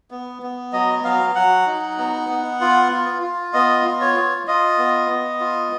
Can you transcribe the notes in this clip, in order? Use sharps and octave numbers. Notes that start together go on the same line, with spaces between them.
B3
B3
F#3 D#5
F#3 F5
F#3 F#5
D#4
B3
B3
F4
F4
F4
B3 D#5
F4
C#5
F4
F4 D#5
B3
B3
F4